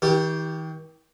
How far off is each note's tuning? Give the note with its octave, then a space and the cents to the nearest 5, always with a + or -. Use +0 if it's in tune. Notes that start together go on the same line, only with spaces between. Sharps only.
D#3 +45 G4 +0